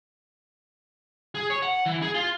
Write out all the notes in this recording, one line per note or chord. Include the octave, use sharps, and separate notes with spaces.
G#4
C#5
F#5
E3
G#4
F4